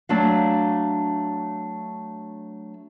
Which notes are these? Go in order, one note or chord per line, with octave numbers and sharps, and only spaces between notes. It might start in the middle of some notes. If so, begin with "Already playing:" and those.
F#3 A3 D4 F5